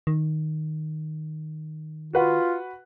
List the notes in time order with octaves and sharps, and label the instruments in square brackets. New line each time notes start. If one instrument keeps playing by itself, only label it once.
[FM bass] D#3
[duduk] F4 [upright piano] F#4 B4 F#5